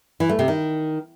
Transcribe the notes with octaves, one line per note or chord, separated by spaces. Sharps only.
E3
A3
C3
D#3